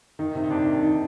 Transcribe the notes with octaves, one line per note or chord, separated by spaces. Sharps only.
D#3 D#4
C3
D#4
C3 D4
D#3
D#3 D#4